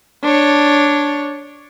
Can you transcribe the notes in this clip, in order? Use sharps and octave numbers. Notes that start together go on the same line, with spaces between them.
D4 C#5